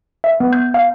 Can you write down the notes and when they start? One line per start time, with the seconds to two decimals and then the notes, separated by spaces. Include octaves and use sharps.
0.24 E5
0.40 B3
0.53 G6
0.74 F5